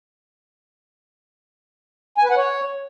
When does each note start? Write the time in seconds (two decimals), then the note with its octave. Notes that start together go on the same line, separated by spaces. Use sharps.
2.18 G#5
2.24 B4
2.30 F#5
2.37 C#5